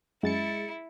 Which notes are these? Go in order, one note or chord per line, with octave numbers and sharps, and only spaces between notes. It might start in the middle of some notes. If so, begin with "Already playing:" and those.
F#2 G#3 E4 A6 C#7